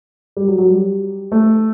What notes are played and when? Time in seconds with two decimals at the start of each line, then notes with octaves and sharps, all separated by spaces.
0.37 G3
0.48 F#3
0.58 F#3
0.68 G3
1.32 A3